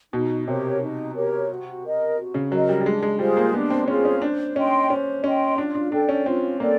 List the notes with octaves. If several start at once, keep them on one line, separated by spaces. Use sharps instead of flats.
B2 D#4
C3 G4 A#4 C#5
D#4
G4 A#4 C#5
F#4
A#4 D#5
F#4
C#3
F#3 A#4 D#5
G3
G3
G#3 D4
G#3
G3 F4 G#4 C5
A#3
B3 D4
C4
C#4 F4 G#4 C5
C#4
D4 C5
C#4 D#5 G5 C6
C#4 C5
C#4 D#5 G5 C6
D4 F4
D4
D4 A4 D5 G5
C#4
C4 F4
A#3 A4 D5 G5